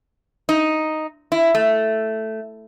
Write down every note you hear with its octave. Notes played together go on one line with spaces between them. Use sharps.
D#4
E4
A3